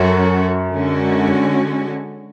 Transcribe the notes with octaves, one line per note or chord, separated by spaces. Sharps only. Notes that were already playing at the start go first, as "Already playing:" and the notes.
Already playing: F#2 F#3 C#4 F#4 A4 C#5
D3 G#3 C#4 F#4